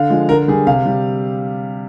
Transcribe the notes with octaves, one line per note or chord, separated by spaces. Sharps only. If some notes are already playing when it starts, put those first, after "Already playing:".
Already playing: D3 F5
F3 G#3
D3 A#4
G3 G#4
C3 F5
G3